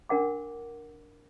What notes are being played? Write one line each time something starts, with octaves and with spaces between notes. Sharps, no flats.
D4 A#4 F#5 D6